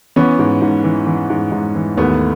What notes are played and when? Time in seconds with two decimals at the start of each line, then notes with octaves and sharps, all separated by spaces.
0.16 E3 B3 C#4
0.39 G#2
0.62 G#2
0.84 E3
1.07 E3
1.30 G#2
1.52 G#2
1.75 E3
1.97 D#2 A3 B3